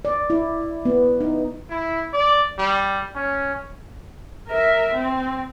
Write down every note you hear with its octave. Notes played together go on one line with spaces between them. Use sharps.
D5
E4
B3
D#4
E4
D5
G3
C#4
A#4 E5
C4